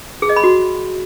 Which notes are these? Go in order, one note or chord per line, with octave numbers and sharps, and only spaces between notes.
G#4
D#5
B5
F#4